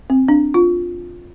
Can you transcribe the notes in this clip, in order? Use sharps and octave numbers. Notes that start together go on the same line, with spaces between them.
C4
D4
F4